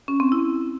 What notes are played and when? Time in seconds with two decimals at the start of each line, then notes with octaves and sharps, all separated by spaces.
0.08 C#4
0.20 C4
0.32 E4